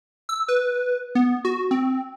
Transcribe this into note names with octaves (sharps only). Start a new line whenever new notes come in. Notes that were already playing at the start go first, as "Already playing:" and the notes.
E6
B4
B3
F#4
C4